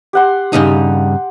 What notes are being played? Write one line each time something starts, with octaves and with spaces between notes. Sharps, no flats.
G4 F#5 C6
G2 C#3 D#4